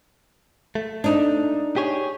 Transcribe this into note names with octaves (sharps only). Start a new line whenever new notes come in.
A3
D4 D#4
G4 G#4 C#5